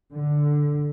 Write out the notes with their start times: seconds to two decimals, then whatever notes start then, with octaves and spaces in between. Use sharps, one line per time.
0.13 D3